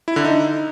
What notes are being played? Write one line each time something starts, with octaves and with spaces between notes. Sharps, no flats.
E4
D3
D#4